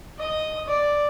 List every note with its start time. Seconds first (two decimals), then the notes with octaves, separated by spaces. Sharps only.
0.19 D#5 D#6
0.68 D5